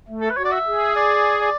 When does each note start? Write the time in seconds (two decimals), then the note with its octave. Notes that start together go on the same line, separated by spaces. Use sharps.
0.08 A3
0.21 A4
0.30 B4
0.37 F#4 C#5
0.45 D5
0.52 E5
0.67 G#4
0.96 D5
1.41 D5